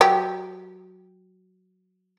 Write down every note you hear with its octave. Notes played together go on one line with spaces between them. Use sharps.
F#3 G4